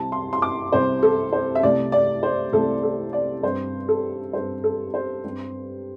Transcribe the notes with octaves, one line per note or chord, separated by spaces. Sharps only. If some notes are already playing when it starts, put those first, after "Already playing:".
Already playing: C2 C3 G3 C4 A5
C6
C6
D6
C2 C3 G3 C4 C5
A4
C5
E5
C2 C3 A3 D5
D5
C5
C2 C3 A3 A4
A4
D5
G2 G3 C4 C5
A4
G2 G3 C4 C5
A4
C5
G2 G3 C4